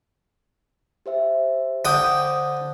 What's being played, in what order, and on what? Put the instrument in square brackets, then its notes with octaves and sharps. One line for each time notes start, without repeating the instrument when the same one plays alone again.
[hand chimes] G4 C5 E5
[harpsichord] D3 G5 D#6 [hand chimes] C5 G6